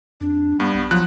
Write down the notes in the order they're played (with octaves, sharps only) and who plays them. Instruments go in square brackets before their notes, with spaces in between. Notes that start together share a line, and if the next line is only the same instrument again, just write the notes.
[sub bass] F2 [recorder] D4
[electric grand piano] G2 [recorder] G3 [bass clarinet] B3
[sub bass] B1 [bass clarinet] B3
[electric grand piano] F3 F#6 [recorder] F#3